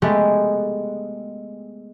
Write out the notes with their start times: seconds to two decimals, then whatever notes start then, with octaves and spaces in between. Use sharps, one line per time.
0.02 G#3 A3 B3 G4